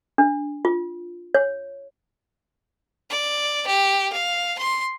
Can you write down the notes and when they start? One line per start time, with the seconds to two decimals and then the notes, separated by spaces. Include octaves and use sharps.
0.18 D4
0.65 F4
1.34 C#5
3.10 D5
3.67 G4
4.12 F5
4.58 C6